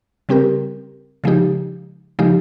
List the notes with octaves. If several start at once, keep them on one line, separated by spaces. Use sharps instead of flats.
C#3 G3 C4 G4 A#4
C#3 F3 G#3 D#4 G4
C#3 F3 G#3 D#4 G4